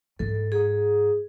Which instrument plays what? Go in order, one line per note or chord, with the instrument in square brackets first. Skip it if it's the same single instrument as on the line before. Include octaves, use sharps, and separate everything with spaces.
[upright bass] G#2 [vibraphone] A4
[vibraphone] G#4